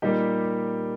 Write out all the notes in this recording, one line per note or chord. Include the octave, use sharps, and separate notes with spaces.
A#2 G3 A#3 D#4 G4